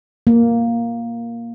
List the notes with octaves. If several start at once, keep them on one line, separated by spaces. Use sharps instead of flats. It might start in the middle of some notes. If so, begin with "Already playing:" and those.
A#3